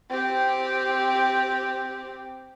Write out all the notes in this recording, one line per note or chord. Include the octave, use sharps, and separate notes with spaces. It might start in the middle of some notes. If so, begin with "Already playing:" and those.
C4 G4